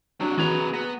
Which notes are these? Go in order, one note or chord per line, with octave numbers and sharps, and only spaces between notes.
C3 F#3 D4
C3 E3 D4 F#4 G#4 B4 A#5
B3 A#6